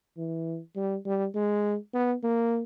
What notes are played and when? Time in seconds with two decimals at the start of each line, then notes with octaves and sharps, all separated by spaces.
0.17 E3
0.76 G3
1.05 G3
1.35 G#3
1.93 B3
2.23 A#3